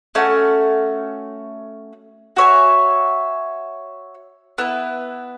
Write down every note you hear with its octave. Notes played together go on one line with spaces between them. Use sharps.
A3 C#4 F#4
F#4 C#5 E5 G#5
B3 E4 B4